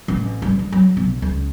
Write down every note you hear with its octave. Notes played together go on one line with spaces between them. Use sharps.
A1
G2
D#3
F#3
B1
C#2